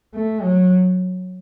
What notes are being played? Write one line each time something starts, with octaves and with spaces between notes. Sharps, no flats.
A3
F#3